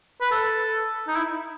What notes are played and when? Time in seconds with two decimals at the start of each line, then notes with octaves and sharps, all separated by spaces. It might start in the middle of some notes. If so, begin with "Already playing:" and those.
0.21 B4
0.32 A4
1.08 D#4
1.16 E4